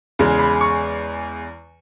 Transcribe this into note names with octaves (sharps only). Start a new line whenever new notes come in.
E2 C#3 G#3
B5
C#6